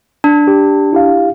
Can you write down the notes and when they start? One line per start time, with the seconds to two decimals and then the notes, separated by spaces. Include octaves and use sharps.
0.24 D4
0.48 G4
0.93 E4 G4 F5